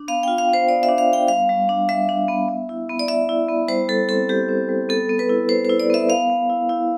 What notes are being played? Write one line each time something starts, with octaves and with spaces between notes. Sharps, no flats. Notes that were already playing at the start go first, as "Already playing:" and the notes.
Already playing: D4
B3 F5
F4 G5
F5
B3 C5
B3 D5
E5
D4
F5
B3 G5
G3 F5
G3
D4
G3 E5
D4
B3
B3
E4
B3
D5
B3 E5
E4
B3
G3 C5
G3 A4
C4 A4
G3 G4
C4
G3
B3 A4
B3
B4
E4
E4 C5
E4 C5
D5
B3 E5
B3 F5
B3
E4
E4